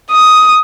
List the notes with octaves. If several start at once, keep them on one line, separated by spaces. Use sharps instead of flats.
D#6